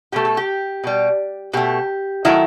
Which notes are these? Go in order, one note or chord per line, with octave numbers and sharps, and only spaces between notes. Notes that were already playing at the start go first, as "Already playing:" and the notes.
B2 A3 G4
A4
G4
B2 G3
B2 A3 G4
D#3 F#3 A3 E4